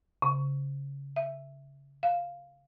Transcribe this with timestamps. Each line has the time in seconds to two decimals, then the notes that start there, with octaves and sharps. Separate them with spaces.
0.22 C#3
1.16 E5
2.03 F5